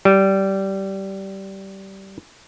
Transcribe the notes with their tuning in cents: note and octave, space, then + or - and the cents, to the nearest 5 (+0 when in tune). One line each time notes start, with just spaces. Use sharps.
G3 -15